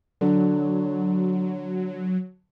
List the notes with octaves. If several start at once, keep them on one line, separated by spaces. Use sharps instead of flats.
D3 F#3